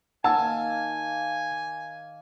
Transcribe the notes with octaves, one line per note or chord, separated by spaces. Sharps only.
D#3 A#3 F5 F#5 G#5 A5 E6